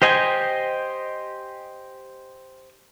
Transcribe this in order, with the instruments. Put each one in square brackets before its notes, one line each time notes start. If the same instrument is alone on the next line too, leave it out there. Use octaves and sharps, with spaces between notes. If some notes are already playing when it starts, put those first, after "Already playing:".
[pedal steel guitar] G4 C5 D#5 G5 G#5